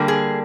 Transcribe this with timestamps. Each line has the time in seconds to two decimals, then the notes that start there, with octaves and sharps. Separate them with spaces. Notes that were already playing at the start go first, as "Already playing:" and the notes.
Already playing: D3 G3 A#3 D4
0.08 G#4